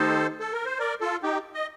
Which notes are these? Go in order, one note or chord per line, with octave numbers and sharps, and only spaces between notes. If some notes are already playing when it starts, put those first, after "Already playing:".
Already playing: D#3 A3 D#4 G4 A4 C5
A4
A#4
C5
A#4 D5
F4 A4
D#4 G4
D#5